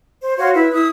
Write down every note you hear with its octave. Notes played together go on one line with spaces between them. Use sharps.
C5
F#4 C#5 F5 C6
E4 B4
E4 D#6